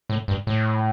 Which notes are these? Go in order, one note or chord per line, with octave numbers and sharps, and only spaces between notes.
A2
G2
A2